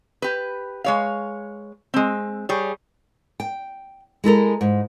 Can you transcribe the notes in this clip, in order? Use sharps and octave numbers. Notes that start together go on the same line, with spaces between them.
G4 B4
G#3 C#5 F5
G#3 C4
G3 G#4 C#5
G5
G#3 E4 A4 A#4
G#2